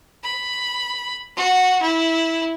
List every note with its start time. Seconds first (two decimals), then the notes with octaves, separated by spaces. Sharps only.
0.24 B5
1.36 F#4
1.82 E4